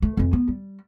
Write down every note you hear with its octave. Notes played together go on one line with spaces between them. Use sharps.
A3
F2 E3
B3
G3